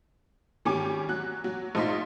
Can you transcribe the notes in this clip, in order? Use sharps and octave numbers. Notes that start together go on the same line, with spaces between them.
G#1 C#4 G4 G#5 D6
F#3 F#6
F#3
A#1 F3 D#4 F4 C6 B6